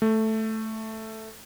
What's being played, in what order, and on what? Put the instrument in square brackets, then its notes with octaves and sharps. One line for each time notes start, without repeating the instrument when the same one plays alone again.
[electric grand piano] A3